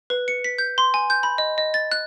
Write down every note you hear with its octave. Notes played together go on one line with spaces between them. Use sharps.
B4
C#7
B6
G6
C6
G#5
G6
B5
D#5
D#5
A6
F#6